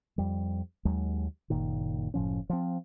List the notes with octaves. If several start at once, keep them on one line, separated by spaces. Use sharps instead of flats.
F2 G3
D#2 F#3 G#3
F#1 A#2 D#3
F#1 A2 F3 C#4
F3 C4